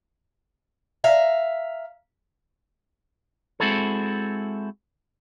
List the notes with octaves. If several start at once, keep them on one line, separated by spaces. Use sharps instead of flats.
E5 F5 A#5
G#3 C4 E4 F#4 G#4 A4